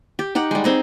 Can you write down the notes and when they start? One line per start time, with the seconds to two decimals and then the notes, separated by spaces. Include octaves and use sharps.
0.19 G4
0.35 D#4 G4 F#5
0.51 G3 G#3
0.64 C4 D#4 G#4